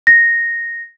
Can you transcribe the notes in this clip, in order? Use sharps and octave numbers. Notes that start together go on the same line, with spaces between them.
A#6